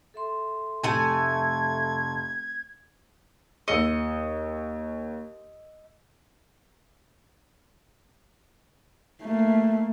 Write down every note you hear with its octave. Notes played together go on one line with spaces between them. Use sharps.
A4 E5 C6
F1 A3 G#5 A5 C6 C#6 G#6
D#2 D#5 E6 C#7
A3 A#3